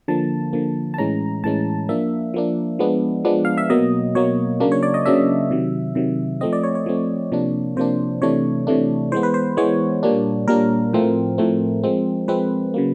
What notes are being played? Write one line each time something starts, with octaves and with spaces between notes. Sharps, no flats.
D3 F3 A#3 A5
D3 F3 A#3
A5
A2 E3 G#3 C#4 A#5
A2 E3 G#3 C#4 A5
F3 A#3 D4 E5
F3 A#3 D4
F3 G#3 B3 D4
F3 G#3 B3 D4
F5
E5
B2 F#3 A#3 D#5
B2 F#3 A#3 C#5
C#3 F#3 A#3 D4
C#5
D5
D#5
C#3 F#3 A#3 D4 E5
C3 D#3 F#3
C3 D#3 F#3
F3 A3 C4 D#5
D5
C#5
C#5
F3 A3 C4
C3 F3 A#3 D4
C3 F3 A#3 D4 C5
C3 E3 A3 D4 C#5
C3 E3 A3 D4
E3 G#3 B3 C5
B4
C5
E3 G#3 B3 C#5
A#2 G3 A#3 D4
A#2 G3 A#3 D4 A#4
A2 F3 A3 C4
A2 F3 A3 C4
F3 G#3 C4
F3 G#3 C4 B4
C#3 F#3 A#3